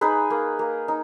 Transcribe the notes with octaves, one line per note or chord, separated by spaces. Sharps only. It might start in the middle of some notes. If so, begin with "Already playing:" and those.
D#4 G#4 B4
A#3
A#3
D#4